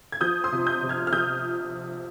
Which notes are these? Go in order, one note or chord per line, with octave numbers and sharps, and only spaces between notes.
G#6
F3 D#6 G6
C6 D#6
C3
D#6 G6
C3
F6 G#6
F6
F3 D#6 G6